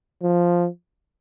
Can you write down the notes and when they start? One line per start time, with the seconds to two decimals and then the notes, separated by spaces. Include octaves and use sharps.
0.22 F3